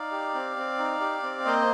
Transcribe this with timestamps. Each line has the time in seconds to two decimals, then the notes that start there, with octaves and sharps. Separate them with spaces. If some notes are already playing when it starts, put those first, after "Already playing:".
Already playing: D#4 D5 F5
0.12 G4
0.34 C4
0.56 C4
0.79 D#4
1.01 G4
1.23 C4
1.45 A#3 C5 D#5